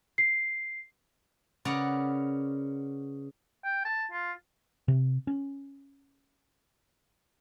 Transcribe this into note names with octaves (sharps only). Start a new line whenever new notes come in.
C7
C#3 A#4 B4 D5 F#5 A#5
G5
A5
F4
C3
C#4